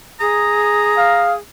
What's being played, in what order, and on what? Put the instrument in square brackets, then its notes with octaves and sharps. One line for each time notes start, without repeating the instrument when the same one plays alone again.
[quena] G#4 [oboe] A#5 [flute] D#6
[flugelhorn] F5